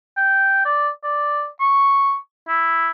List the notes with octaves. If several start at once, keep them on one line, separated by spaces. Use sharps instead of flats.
G5
D5
D5
C#6
E4